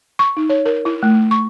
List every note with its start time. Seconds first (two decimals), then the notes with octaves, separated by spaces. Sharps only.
0.19 C#6
0.37 D#4
0.50 C#5
0.65 A#4
0.85 E4
1.03 A3
1.31 C#6